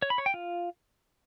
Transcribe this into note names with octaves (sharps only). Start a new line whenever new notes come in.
C#5
B5
C#5
G5
F4